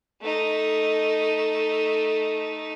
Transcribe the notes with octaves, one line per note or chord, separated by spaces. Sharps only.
A3 D#4